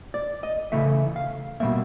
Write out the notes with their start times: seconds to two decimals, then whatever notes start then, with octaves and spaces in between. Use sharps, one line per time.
0.14 D5
0.43 D#5
0.72 C#3 E3 A3 E5
1.16 F5
1.60 B2 G3 A#3 E5